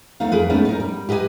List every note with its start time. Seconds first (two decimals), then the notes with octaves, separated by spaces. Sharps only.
0.20 D#2 A3 B3 D#4 F5
0.32 F2 G#4 A#4 B4
0.49 G#3 A3 B3 C#4 D#4 E4
0.65 D#4 A#4
0.80 G3
1.09 G4 B4 D#5 E5 G#5